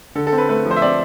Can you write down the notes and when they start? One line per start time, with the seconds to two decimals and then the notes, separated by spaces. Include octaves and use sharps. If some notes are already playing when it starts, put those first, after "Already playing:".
0.15 D3 A4
0.27 A4
0.33 C4
0.38 B4
0.49 A3 B4
0.65 F3
0.71 C5
0.76 E5
0.82 C4 D5